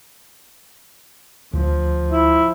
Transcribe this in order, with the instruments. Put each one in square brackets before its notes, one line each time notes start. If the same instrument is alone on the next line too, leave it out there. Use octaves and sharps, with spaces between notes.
[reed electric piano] D2 [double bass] F3
[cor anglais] E4